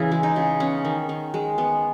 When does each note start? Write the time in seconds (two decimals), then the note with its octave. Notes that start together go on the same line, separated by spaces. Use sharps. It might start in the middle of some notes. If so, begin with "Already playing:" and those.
Already playing: C#3 E3 E4 G#4
0.12 G#3
0.23 D#4
0.36 C#3
0.60 B3 C#4
0.85 D#3
1.09 D#3
1.34 G#3
1.58 B3